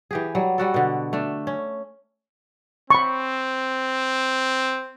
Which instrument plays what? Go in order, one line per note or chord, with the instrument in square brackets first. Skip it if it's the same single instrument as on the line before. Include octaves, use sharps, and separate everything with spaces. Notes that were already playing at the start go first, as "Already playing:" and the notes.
[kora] E3 G4 G#4
F#3 G3
G3 F#4 A4
B2 D3
A3 D4
C#4
[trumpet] C4 [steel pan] B5 C#6